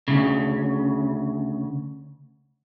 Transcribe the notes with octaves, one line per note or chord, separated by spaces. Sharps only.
D2 G#2 C#3